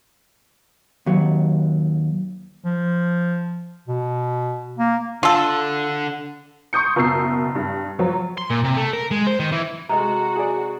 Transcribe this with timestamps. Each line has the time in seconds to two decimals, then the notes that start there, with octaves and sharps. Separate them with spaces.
1.06 D#2 F#3
2.65 F3
3.87 B2
4.78 A#3
5.23 D3 F4 A4
6.73 C6 C#6 D#6 G6 C#7
6.96 F#1 B2 E6 C7
7.55 G2
7.99 F3 F#3
8.38 C6
8.50 A#2
8.65 C3
8.77 A3
8.93 A#4
9.11 G#3
9.27 C5
9.40 D#3
9.52 E3
9.89 C3 G#3 F#4 A4 A#5
10.36 G#4 D5